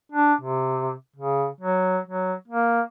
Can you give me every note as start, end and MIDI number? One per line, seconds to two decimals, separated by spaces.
0.12 0.34 62
0.41 0.93 48
1.16 1.47 49
1.61 1.99 54
2.08 2.34 54
2.48 2.81 58